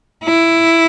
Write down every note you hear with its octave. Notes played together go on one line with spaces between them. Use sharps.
E4